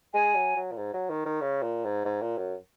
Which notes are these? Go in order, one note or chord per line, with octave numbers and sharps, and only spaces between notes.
G#3 G#5
F#3
F#3
A#2
G#2
F#3
D#3
D#3
C#3
A#2
G#2
G#2
A#2
F#2